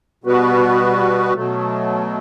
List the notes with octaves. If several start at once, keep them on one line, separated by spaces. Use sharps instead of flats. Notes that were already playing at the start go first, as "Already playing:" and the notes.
B2 G3 B3 F#4 B4
B2 F#3 A3